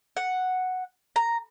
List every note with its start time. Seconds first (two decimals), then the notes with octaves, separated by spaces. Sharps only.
0.16 F#5
1.16 A#5